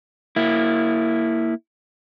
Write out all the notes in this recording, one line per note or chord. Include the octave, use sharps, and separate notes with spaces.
A#3 E4